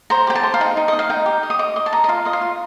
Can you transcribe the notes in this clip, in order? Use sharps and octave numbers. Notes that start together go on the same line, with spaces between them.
C5 A#5
G4 G5
A5
C5
F5
D#4 G5
D#4
D#5
D#4
F5
D#4 G5
G4
D#5
D#6
D#5 D6
D#5 D6
A5
D#4 A#5
D#5
F4 F5
F4 D#5
F5
F4